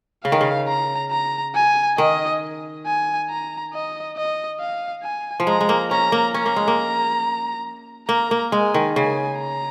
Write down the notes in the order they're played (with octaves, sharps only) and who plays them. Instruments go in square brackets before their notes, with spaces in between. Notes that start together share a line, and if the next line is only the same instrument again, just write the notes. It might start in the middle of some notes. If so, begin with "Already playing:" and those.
[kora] C#3 [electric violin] F5
[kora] D#3
C#3
[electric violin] A#5
A#5
G#5
[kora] D#3 [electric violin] D#5
[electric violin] G#5
A#5
D#5
D#5
F5
G#5
[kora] F3
[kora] G#3 [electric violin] A#5
[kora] G#3
A#3
[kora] C#4 [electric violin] A#5
[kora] A#3
[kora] C#4 [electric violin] A#5
[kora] A#3
G#3
A#3
[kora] A#3 [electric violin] A#5
[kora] A#3
[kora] G#3 [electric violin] G#5
[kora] D#3
[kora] C#3 [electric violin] G#5
[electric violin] A#5